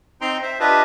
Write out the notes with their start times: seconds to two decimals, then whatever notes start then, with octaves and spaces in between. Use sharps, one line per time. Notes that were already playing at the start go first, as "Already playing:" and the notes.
0.21 C4 D#4 G5 A#5 C6
0.42 C5 E5
0.60 D4 F4 G4 B4 D#5 E5